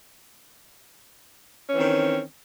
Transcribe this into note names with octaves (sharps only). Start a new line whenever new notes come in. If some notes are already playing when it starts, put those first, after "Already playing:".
D#3 E3 C4 C#4